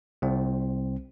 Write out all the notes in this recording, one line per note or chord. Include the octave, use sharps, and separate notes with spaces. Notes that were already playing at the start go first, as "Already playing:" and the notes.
C2 C4